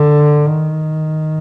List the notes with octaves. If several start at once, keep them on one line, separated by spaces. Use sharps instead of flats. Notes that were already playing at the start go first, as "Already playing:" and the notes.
Already playing: D3
D#3